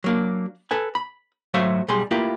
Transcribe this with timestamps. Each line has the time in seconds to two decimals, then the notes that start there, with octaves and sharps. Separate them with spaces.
0.04 F#3 A#3 D4
0.71 A4 B4 G#5
0.95 B5
1.54 G#2 F#3 A3 C5 E5 F5
1.88 B1 G3 G#4 C6
2.11 A3 A#3 E4 F4 G4 B4